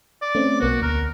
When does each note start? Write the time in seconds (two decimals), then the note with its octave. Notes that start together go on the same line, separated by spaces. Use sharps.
0.22 D5
0.35 A3 C4 C#4
0.60 B1 A#3 B3 F#4
0.82 D2 A#4